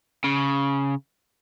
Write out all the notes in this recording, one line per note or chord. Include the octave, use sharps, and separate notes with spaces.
C#3